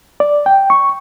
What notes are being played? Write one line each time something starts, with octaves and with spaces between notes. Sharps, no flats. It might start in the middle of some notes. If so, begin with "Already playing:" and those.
D5
G5
C#6